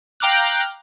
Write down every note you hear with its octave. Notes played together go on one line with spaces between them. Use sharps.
F5 G5 A#5 D6 F6 F#6